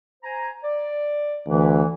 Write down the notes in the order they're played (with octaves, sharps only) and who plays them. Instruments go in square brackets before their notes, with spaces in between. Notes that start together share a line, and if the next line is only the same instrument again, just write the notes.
[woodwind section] C5 G#5 A#5
D5
[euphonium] D2 [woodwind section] E3